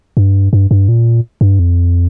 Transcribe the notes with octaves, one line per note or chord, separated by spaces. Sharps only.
G2
G2
G2
A#2
G2
F2